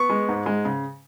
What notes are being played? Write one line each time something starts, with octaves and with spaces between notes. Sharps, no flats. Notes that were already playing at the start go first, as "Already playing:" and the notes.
Already playing: B3 C#6
G#3
G#2
G#3
C#3